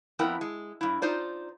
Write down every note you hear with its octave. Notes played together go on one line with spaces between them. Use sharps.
F2 B3 E4 A#4 G5
G#3
G2 E4
D#4 F4 C5 D5